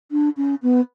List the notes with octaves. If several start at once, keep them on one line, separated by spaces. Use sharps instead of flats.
D4
C#4
B3